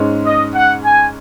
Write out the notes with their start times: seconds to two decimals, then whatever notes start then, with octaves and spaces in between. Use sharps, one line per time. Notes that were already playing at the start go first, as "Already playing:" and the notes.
Already playing: G#2 G#3 C#4
0.25 D#5
0.54 F#5
0.84 G#5